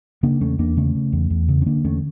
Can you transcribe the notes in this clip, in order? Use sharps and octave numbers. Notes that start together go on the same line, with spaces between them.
C#3 A#3 D4
E2 A3 C#4
E2 A#3 D4
C#3 A3 C#4
C#3
E2
E2
C#3
C#4
D3 A#3 D4
E2 A3 C#4